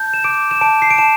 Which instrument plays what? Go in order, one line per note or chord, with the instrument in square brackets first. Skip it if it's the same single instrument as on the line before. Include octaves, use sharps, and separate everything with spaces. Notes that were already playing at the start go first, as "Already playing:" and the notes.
Already playing: [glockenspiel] A5 G6
E7
D6 D7
E7
A5 D7
C7
D7
A5 E7